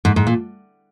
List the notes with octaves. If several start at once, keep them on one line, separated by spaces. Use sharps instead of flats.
G#2
G#2
A#2